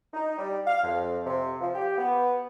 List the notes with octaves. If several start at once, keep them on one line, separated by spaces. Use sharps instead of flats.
D#4
G3
F5
F2
C3
F3
G4
B3